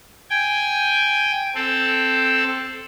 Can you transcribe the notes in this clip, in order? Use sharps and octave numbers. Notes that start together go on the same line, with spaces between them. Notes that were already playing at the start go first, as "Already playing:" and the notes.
G5 G#5
C4 A4